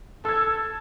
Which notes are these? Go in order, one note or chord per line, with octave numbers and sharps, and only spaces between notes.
A4 E6 G#6